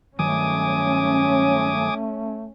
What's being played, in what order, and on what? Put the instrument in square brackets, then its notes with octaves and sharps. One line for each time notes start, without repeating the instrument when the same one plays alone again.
[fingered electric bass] G2 D#3 F#3 [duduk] A3 [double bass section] C#4 [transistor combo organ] G#5 D6 D#6